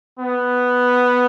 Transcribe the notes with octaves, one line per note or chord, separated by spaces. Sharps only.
B3